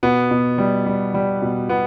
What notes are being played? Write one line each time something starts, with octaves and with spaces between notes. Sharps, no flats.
B2 B3
B2
G3
G3
G3
B2
B2 B3